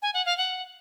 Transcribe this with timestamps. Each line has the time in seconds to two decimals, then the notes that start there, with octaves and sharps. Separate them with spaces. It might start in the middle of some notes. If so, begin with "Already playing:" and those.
0.02 G#5
0.14 F#5
0.26 F5
0.38 F#5